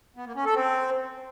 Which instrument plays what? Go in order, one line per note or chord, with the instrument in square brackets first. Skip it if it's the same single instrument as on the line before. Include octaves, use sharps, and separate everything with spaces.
[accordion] B3
A#3
C#4
A4
C4